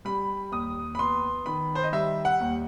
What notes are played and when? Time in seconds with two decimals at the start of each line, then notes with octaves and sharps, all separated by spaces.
0.05 G3 B5
0.51 D#2 D#6
0.95 B5
0.99 B3 C6
1.46 D#3 B5
1.75 C5
1.83 D#5
1.92 G3 E5
2.25 F#5
2.40 D#2